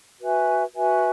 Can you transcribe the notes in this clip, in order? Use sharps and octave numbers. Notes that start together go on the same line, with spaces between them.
F#4 B4 E5 G#5
F#4 B4 E5 G#5